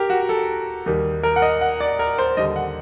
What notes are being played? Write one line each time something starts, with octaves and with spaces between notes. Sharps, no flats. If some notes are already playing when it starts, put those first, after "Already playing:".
Already playing: G4 A#4
F#4
A4
D#2 D#3 G3
A#4
F#5
D#5
F#5
D5
A#4
C5
D#2 D3 G3 D#5
F#5